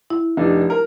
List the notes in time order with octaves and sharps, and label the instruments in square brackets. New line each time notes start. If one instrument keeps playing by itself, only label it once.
[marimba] E4
[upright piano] F1 D4 D#4
A#4